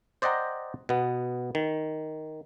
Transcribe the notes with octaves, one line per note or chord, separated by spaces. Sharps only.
C5 D5 D#5 F#5 G5 A#5
B2 B3
D#3